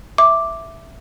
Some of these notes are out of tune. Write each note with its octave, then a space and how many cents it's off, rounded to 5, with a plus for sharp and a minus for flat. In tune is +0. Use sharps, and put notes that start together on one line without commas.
E5 +0 D6 +0